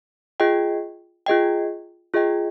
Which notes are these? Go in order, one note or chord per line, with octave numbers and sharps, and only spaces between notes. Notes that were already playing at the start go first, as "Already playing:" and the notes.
F4 G#4 D#5 G5
F4 G#4 D#5 G5
F4 G#4 D#5 G5